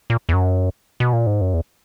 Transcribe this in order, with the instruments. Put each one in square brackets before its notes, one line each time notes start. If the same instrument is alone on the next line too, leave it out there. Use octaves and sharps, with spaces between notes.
[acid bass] A#2
E2
F#2
B2
A#2
G#2
F#2
E2